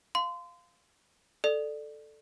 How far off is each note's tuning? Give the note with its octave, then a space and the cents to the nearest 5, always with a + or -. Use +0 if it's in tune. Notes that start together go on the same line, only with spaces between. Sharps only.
F5 +0 C6 -25
A4 +0 D5 +15